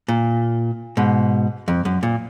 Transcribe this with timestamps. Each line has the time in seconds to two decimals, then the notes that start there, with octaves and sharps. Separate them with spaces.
0.08 A#2
0.97 G#2 B2
1.68 F2
1.85 F#2
2.03 A#2